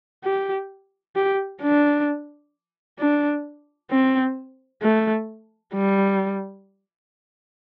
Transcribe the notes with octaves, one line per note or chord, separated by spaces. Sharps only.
G4
G4
D4
D4
C4
A3
G3